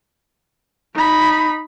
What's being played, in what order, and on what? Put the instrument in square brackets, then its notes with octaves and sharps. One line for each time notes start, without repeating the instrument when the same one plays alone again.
[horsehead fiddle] D#4 B5